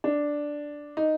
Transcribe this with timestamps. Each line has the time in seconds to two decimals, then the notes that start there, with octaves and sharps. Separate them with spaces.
0.04 D4
0.97 D#4